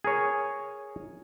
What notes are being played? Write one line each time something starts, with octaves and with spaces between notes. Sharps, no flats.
G#4 A#4 C#5